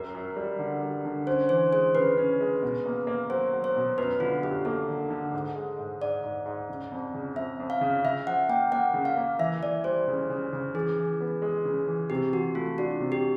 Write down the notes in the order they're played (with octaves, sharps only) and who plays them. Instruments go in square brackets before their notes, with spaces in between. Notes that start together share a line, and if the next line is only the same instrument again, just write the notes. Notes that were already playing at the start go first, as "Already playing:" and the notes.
Already playing: [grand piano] F#2 [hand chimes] A#4
[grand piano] F#2
G3
D3
G3
D3
[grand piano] C#4 [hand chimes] C5
[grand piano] E3 [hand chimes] C5
[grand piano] G#3 [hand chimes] C5
[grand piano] C#3 [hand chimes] B4
[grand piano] C#4
G#3
B2
A#3
A#3
[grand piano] F#3 [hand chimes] C5
[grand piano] F#3
[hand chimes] C5
[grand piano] B2
[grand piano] F#2 [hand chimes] B4
[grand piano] D3 [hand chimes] F4
[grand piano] F#2 [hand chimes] G4
[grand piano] A#3 [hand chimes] A4
[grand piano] D3
D3
G#2
G#3
G#2
[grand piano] G#2 [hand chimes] D5
[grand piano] G#2
G#2
C#3
F2
C#3
[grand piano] F2 [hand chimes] E5
[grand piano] F2
[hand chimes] F5
[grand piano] C#3
[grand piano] C#3 [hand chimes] E5
[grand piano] F3 [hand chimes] F#5
[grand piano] A#3 [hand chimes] G5
[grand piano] A#3 [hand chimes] F#5
[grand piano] C#3
[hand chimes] F5
[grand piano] A#3
[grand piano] E3 [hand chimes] E5
[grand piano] E3 [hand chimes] D5
[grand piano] G3 [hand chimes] C5
[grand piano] C#3
C#3
C#3
[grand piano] E3 [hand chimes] G#4
[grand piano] E3
B3
G#3
C#3
E3
[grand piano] C3 [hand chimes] G4
[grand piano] E3 [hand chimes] F#4
[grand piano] A3 [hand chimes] F4
[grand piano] D4 [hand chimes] F#4
[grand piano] C3
[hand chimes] G4